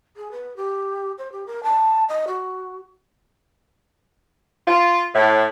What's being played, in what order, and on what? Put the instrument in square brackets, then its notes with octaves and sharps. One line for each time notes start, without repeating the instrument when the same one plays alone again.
[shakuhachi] G#4
B4
G4
C5
G4
A#4
A5
D#5
F#4
[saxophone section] F4
A2